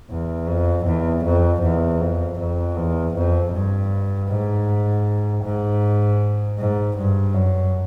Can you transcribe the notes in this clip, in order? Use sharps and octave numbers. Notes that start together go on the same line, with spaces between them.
E2
F2
E2
F2
E2
F2
F2
E2
F2
G2
G#2
G#2
G#2
G2
F#2